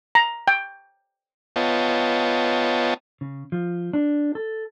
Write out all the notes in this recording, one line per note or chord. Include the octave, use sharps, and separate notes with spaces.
A#5
G5
B3 F4 C#5 D#5 G5 A5
C#3
F3
D4
A4